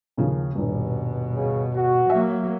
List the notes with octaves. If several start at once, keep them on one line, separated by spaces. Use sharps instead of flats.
D#2 C#3 F3
D#1 G2 B2
C#3
F#4
F#3 A#3 E5